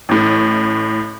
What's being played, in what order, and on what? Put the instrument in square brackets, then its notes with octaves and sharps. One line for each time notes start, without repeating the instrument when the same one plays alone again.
[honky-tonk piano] A1 A2